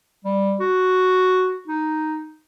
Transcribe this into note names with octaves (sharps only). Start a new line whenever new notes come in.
G3
F#4
D#4